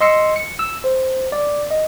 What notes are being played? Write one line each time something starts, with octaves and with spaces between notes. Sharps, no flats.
D#5 C6 E6 C#7
C#7
E6
C5
D5
D#5